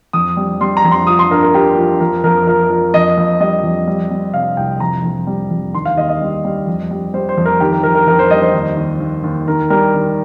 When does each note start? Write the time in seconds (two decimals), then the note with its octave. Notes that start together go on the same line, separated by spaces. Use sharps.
0.13 F2 D#6
0.37 G3
0.61 G3 C6
0.77 A#5
0.85 F2
0.91 C6
1.07 F3 D#6
1.19 C6
1.31 G2 A#4
1.43 A#4
1.54 G2 G4
1.77 F3
2.00 F2 A#4
2.24 F2 A#4
2.47 F3 A#4
2.70 F3 A#4
2.94 F2 D#5
3.17 F2
3.40 G3 D#5
3.64 F2
3.87 G3
4.11 G3
4.33 C3 F5
4.57 C2 G5
4.80 F2 A#5
5.04 F2
5.27 G3
5.50 F2
5.74 D#2 C6
5.85 F5
5.97 D#2 D#5
6.09 D#5
6.21 G3
6.44 G3
6.67 F2
6.91 G3
7.14 G3 C5
7.29 C5
7.37 F2
7.45 A#4
7.60 D#3 G4
7.72 A#4
7.83 F2 A#4
7.95 A#4
8.07 F2 A#4
8.19 C5
8.30 G3 D#5
8.42 C5
8.54 D#2
8.77 D#2
9.00 D#2
9.24 D#2
9.48 D#3 A#4
9.70 G3 A#4
9.94 D#3